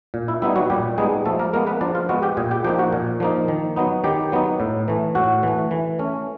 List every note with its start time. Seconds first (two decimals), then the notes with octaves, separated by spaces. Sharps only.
0.14 A#2
0.28 E4
0.42 G3 B3 D#4 E4
0.56 F#3 F#4
0.70 A#2 G3 G4
0.98 G3 G#3 B3 D#4 G#4
1.25 F3 A3 A4
1.39 A#3 A#4
1.53 G#3 A#3 B3 A#4
1.67 B3 B4
1.81 F3 D4 D5
1.95 F4 F5
2.09 G#3 B3 F#4 F#5
2.23 G4 G5
2.37 A#2 G#4 G#5
2.51 G4 G5
2.64 F3 G4 G5
2.67 A#3 D#4
2.79 F#4 F#5
2.93 A#2
3.20 F3 A#3 D#4
3.48 D#3
3.76 F#3 B3 D#4
4.04 D#3 G4 G5
4.32 F#3 B3 D#4
4.60 A2
4.88 E3 A3
5.15 A2 F#4 F#5
5.43 E3 A3
5.71 E3
5.99 A3 C#4